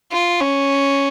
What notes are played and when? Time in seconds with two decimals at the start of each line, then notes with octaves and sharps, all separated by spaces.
0.12 F4
0.41 C#4